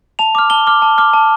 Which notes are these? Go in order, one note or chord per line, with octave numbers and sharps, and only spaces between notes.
A5 F7
D6 F6
A5 G7
D6 F6
A5
D6 F6
A5